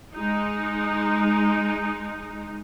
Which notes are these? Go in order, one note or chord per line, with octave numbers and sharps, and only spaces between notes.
G#3 D#4